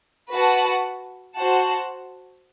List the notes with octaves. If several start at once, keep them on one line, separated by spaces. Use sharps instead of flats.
F#4 B4 F#5 A5
F#4 C5 F#5 A5